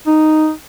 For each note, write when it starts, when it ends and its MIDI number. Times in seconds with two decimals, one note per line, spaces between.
0.07 0.51 63